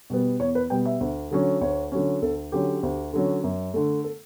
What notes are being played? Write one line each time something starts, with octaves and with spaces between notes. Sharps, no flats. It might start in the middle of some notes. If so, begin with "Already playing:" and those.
B2 G3 B3
E2 C#5
B4
B2 G3 B3 G5
E5
D2
D3 F#3 C#4
D2 C#5
D3 F#3 C#4
D2 A4
D3 F#3 C#4 G4
D2
D3 F#3 C#4
F#2
D3 A3
A4